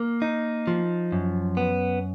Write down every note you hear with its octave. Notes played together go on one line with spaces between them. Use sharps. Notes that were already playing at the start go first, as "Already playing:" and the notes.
Already playing: A#3
D#4
F3
F#2
B3